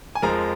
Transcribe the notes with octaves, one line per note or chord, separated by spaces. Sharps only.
G#5
F2 F3 G#3 A#4 A#5